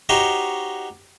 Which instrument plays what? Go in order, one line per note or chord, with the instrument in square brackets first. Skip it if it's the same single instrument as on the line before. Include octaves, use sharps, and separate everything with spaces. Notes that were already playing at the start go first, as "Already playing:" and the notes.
[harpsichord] D#4 F#4 G4 C5 C#5 D#5